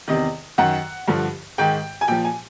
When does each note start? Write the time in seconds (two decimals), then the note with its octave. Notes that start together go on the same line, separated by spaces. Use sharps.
0.08 E2 C3 D#3 D#5
0.58 F#2 D#3 F#5
1.08 G2 D3 F3
1.58 G#2 D#3 G5
2.01 G#5
2.08 A#2 F3 G5
2.24 G#5